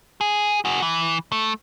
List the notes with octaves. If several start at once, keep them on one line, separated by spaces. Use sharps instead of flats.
G#4
F#4 G#4
E3
A3